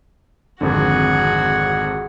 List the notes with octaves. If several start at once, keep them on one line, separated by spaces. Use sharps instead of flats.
G#1 F2 D3 F#4 G#4